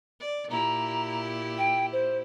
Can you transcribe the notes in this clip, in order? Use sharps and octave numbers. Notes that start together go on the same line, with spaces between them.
D5
A#2 E4 G4 A#5
G5
C5